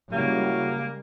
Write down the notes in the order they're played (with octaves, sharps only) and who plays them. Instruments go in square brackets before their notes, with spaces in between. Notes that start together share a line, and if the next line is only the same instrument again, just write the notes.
[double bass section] C#3 G3 G#3 [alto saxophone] A#3 [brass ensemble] C#4 E4 F#4